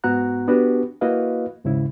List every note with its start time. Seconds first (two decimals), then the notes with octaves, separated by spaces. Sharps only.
0.04 G#2 B3 F#4 F#5 A#5 F#6
0.48 B3 D4 F#4 G4 B4
1.01 A#3 E4 F#4 B4 D#5 F5
1.64 D#2 G#2 C#3 E4